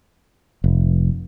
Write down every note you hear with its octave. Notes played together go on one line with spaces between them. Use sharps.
F1